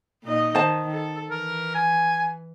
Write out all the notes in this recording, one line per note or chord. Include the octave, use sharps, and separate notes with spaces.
A#2 D#4 D#5
D#3 C5 A5
A4
E3 A#4
G#5